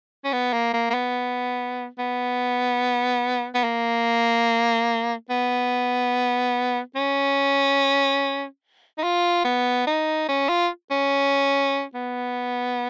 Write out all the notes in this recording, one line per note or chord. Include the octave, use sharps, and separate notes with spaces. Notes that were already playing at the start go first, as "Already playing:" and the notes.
C#4
B3
A#3
A#3
A#3
B3
B3
B3
A#3
B3
C#4
D#4
F4
B3
D#4
C#4
F4
C#4
B3